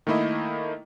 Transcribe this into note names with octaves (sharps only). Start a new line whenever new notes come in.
D#3 A3 A#3 E4 D#5